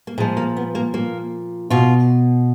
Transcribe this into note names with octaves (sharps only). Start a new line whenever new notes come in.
A#3
A#2 F3 G#3
A#3
B3
A#3
A#3
B2 F4